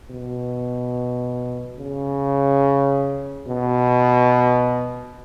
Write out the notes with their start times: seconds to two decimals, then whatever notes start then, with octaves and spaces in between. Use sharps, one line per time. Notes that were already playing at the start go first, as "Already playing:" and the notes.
0.11 B2
1.79 C#3
3.47 B2